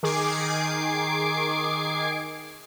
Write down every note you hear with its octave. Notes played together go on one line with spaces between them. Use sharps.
D#3 G#4 D6 G#6 C7 D7